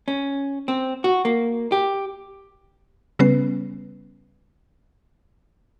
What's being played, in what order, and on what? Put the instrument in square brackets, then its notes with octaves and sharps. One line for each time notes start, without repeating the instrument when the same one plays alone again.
[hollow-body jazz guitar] C#4
C4
F#4
A#3
G4
[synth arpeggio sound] C#3 G3 B3 C#4 B4 C7